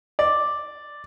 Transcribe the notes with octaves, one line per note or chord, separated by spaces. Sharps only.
D5